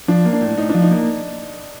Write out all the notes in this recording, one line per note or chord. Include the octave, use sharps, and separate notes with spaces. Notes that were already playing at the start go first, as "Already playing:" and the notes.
F3 D4
A#3
D4
A2
A2 D#4
D4
F3
D#4
A#3